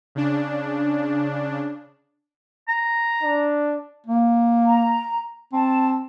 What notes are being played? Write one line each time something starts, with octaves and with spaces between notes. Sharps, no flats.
C#3 D4
A#5
D4
A#3
A#5
C4 A5